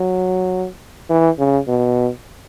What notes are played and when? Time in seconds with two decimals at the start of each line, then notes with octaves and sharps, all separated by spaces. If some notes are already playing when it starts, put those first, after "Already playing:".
Already playing: F#3
1.10 E3
1.39 C#3
1.68 B2